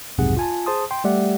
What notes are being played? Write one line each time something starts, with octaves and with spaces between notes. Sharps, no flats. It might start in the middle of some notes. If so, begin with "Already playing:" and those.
B1 F2 G#2 C3 G#4 F#5
F4 G#5 A5
G#4 C5 A5 C6 D#6
G5 C6
G3 A3 G4 D5 E5 F#5